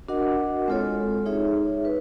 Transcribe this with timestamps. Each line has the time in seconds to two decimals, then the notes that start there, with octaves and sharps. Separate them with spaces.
0.08 D4 F#4 A#4 D#5 F#5
0.68 G#3 C4 F4 A4 C#5
1.26 D#4 G#4 C#5 E5
1.85 B4